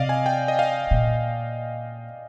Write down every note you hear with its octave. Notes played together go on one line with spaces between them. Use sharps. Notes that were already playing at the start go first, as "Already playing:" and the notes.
Already playing: C3 D5 D#5 F5
G#5
G5
D#5
F5
A#2